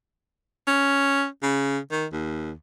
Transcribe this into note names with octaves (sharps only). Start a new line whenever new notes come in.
C#4
C#3
D#3
D#2